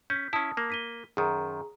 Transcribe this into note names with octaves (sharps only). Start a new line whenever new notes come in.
C#4 G6 B6
C#4 E4 A5 D#6
A#3
B6 D#7 G7
F#2 D#3 G#4 A#5